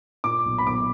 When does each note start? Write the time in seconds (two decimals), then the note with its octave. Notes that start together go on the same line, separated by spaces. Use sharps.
0.24 A#2 D6
0.46 B1
0.58 B5
0.66 B1 D6